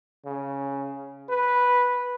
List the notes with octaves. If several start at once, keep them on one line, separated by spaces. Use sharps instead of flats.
C#3
B4